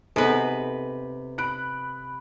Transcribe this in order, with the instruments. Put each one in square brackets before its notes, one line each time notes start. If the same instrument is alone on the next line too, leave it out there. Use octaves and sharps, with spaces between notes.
[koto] C3 B4 [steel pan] B3 D#4 G#4 [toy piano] A4
[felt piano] B5 F#6 D7